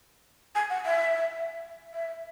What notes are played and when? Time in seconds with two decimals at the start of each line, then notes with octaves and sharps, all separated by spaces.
0.55 G#5
0.70 F#5
0.86 E5
1.94 E5